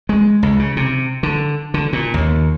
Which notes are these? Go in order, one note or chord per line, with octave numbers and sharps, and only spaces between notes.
G#3
C#2
C#3
C3
D3
D3
A#2
D#2